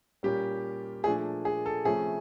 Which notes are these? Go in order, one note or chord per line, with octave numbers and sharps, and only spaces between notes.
A#2 G3 A#3 C#4 G4
A#2 F3 A3 D4 G#4
G#4
A4
C3 F3 A3 C#4 G#4